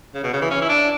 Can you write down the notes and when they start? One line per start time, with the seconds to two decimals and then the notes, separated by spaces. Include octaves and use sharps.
0.15 C#3
0.23 B2
0.33 C#3
0.41 E3
0.51 C#4
0.62 E4
0.69 D4